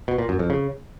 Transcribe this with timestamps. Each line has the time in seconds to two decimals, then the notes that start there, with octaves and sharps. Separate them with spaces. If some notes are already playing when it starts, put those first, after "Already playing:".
0.08 B2
0.18 A#2
0.29 F#2
0.39 F2
0.50 C#3